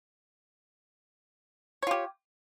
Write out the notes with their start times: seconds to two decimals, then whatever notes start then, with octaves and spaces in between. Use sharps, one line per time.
1.83 C#5
1.87 F4
1.91 G4